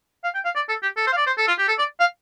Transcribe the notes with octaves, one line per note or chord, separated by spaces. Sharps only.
F5
G5
F5
D5
A4
G4
A4
C5
F5
D5
C5
A4
F4
G4
A4
D5
F5